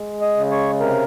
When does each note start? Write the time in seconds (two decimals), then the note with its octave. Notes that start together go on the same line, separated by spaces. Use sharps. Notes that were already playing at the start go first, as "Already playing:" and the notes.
Already playing: G#3
0.22 D#5
0.37 C#3
0.51 C#5
0.80 C3 A#4